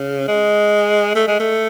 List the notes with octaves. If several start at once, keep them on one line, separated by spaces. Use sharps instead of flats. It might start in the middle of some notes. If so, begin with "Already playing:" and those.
Already playing: C#3
G#3
A3
G#3
A3